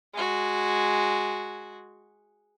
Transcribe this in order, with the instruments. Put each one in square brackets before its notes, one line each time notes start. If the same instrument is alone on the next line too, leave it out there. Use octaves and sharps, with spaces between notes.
[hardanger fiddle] G#3 F#4